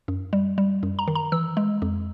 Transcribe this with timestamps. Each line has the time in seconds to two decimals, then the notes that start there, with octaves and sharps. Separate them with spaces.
0.08 F#2
0.33 G3
0.58 G3
0.83 F#2
0.99 A#5
1.07 D#3
1.15 A#5
1.32 E3 E6
1.57 G#3
1.82 F2